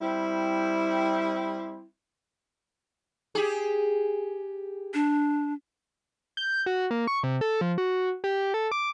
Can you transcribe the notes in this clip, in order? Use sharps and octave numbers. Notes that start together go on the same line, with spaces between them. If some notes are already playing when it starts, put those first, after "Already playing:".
G3 C4 E4
G4 G#4
D4
G6
F#4
A#3
C#6
C3
A4
F3
F#4
G4
A4
D6